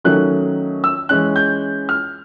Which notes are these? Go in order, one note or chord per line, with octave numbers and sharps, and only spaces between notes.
D#3 F#3 A3 C#4 F#6
E6
E3 G#3 C#4 F#6
G6
F6